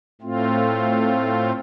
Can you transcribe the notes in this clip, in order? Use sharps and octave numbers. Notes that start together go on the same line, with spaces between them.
A2 A3 C4 F4